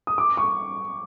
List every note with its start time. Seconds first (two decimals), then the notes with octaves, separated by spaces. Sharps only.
0.07 D#6
0.18 D6
0.37 C#6